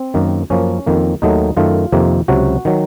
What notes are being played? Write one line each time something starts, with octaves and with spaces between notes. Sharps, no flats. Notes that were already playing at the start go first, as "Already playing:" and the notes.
Already playing: C4
F#2 D#3 A#3
F#2 F3 A#3 C#4
F2 D#3 A#3
D#2 D#3 F#3 A3 D#4
F#2 D#3 A3 F4
F2 C3 D#3 A#3
C#2 C3 F#3 F#4
D#3 F#3